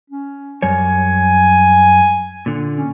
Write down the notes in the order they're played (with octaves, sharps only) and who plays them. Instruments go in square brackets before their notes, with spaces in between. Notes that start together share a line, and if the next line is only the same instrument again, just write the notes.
[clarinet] C#4
[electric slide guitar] F#2 G3 C#5 [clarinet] G#5
[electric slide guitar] A#2 D3
[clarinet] C#4